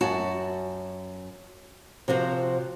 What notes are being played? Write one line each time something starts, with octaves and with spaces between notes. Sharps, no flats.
F#2 F#4 A5
C3 F3 F#4 C5